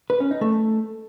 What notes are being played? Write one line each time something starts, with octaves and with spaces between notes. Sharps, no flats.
B4
C#4
D#4
A3